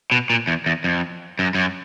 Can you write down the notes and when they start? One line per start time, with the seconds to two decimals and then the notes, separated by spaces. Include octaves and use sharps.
0.12 B2
0.30 A#2
0.47 E2
0.66 E2
0.84 F2
1.39 F#2
1.55 F#2